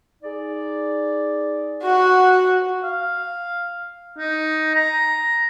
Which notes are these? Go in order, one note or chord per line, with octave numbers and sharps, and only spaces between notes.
D#4 G#4 D5
F#4 F#5
F5
D#4
A#5